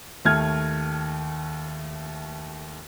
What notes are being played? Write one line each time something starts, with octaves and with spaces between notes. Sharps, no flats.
D#2 A3 F6 G#6